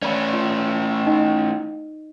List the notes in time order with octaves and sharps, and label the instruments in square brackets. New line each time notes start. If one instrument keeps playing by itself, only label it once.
[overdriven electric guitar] A3 C#4 [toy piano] D5 B5 C6
[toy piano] F4
D#4 D#5